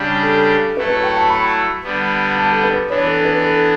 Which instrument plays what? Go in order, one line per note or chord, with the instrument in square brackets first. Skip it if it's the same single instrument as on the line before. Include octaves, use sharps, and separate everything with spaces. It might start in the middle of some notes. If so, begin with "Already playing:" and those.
Already playing: [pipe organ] C#3 G3 D4 G4
[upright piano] A4
[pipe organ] F#3 A3 E4 A4 [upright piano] B4
[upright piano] B4
G5
A5
B5
[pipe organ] D3 G3 B3
[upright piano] A5
A4
B4
[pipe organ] E3 B3 D4 [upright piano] C#5
[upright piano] A4
B4
A4